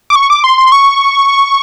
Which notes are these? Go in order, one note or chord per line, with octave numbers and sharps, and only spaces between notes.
D6
C#6
D6
C6
C6
C#6